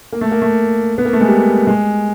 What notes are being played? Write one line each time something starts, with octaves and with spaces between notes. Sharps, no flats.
A#3
A3
A#3
A3
B3
A#3
A3
G#3
G3
G#3